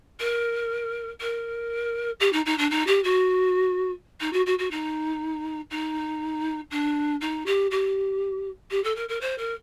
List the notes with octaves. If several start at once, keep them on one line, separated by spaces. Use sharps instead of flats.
A#4
A#4
G4
D#4
D#4
D4
D#4
G4
F#4
D#4
F#4
F#4
F#4
D#4
D#4
D4
D#4
G4
G4
G4
A4
A#4
A#4
C5
A#4